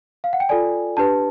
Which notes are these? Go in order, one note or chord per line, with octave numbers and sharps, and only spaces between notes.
F5
F#5
G5
F4 A4 D5 G#5
D4 G4 B4 A5